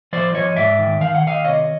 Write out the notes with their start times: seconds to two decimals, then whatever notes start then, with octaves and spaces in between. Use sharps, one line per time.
0.13 F3 C5 D5
0.34 F3 C#5 D#5
0.56 G#2 D5 E5
0.79 D#3
1.01 D#3 F5
1.15 F#5
1.22 D#3 D#5 F5
1.44 C3 C#5 D#5